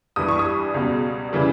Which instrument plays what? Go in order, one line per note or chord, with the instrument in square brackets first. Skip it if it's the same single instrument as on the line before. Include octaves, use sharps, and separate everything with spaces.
[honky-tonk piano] G2 E3 G3 D#6
C#6
D#6
C#2 B2 G3
C#3 E3 G3